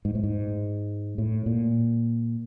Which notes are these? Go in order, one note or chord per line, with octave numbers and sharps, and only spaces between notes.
G#2
A2
G#2
A2
A#2